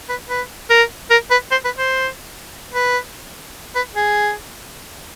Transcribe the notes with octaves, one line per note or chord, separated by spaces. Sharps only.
B4
B4
A#4
A#4
B4
C5
B4
C5
B4
B4
G#4